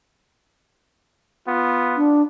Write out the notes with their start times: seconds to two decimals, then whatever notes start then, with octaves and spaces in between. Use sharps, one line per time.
1.46 B3 F4
1.97 D4